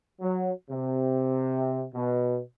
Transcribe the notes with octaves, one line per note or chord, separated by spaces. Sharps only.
F#3
C3
B2